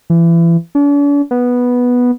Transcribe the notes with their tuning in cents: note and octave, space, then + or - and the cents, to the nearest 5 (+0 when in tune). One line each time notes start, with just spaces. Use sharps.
E3 +30
D4 -45
B3 -5